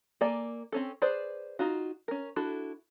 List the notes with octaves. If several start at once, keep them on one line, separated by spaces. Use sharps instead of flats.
A#3 A4 D5 G#5
C4 C#4 A4
G#4 B4 C5 D5
D#4 F4 F#4
C#4 A#4
D4 E4 F#4 A4